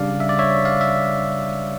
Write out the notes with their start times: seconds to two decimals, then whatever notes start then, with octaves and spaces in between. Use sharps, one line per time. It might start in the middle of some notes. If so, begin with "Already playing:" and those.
Already playing: C#3 G3 D4 D5 F5
0.20 E5
0.29 D5
0.39 C#5 E5
0.65 D5 F5
0.81 E5